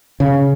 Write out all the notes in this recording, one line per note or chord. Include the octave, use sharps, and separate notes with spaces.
C#3